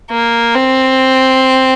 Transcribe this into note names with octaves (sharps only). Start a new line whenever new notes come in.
A#3
C4